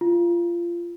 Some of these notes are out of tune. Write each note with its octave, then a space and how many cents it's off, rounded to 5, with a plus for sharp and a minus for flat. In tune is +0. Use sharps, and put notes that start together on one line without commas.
F4 -20